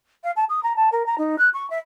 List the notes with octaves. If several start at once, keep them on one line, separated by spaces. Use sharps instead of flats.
F5
A5
D#6
A#5
A5
A#4
A#5
D#4
F#6
C#6
E5